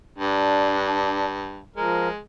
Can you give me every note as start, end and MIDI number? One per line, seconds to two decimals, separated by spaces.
0.18 1.64 43
0.18 1.25 62
1.76 2.09 53
1.76 2.19 56
1.76 2.09 70